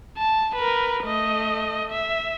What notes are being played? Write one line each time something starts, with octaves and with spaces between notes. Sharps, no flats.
A5
A#4 B4
A3 D#5
E5